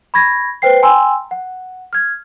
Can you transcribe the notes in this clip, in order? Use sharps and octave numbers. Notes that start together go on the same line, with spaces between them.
B5 C#6 G#6 A#6
B4 C5 G5 C7
G5 G#5 A#5 C6 E6
F#5
F6 G#6